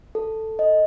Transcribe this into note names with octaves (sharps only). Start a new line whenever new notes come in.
A4
D#5